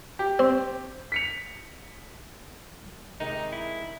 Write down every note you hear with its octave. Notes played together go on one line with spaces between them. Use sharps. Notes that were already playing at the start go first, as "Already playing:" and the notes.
G4
C4
B6 C#7 F7
C3 D#3 G#3 D#4
E4